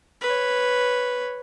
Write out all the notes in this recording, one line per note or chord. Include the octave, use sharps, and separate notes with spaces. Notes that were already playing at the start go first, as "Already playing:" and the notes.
B4 C#5